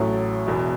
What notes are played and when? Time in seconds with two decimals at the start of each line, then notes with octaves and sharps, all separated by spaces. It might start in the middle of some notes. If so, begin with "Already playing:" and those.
Already playing: A1 A2 F#3
0.47 E1 E2 B2